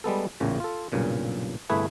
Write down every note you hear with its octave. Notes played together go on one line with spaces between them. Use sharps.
G3 G#3 B3 A4
A1 E2 A#2 C#3
F4 A4
B1 G2 A#2 C#3
G1 C2 A3 E4 G#4 B4